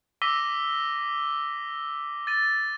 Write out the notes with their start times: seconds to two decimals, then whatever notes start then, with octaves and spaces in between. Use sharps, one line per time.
0.22 D6 E6 A#6 B6 D#7 G7
2.27 A6 D#7